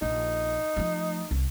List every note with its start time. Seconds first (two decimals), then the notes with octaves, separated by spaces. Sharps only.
0.02 A#1 D#4
0.77 F3 A3
1.31 C2